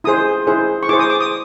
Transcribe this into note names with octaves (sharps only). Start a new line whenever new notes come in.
E4 G#4 C5 D#6
E4 G#4 C5
C#6
E4 G#4 C5 D6
D#6
D6
D#6